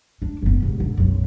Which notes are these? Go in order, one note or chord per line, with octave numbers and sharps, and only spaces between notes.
D4
F#1 B3
E1 C3
D3
B1 F#2